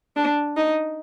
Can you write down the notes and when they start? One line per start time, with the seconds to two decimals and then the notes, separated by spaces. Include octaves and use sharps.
0.16 D4
0.57 D#4